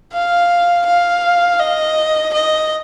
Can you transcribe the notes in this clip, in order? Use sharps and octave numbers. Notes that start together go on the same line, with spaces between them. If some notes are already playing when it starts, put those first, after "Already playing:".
F5
F5
D#5
D#5